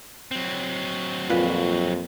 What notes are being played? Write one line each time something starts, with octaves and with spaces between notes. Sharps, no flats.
F#3 C4
F2 A#2 B4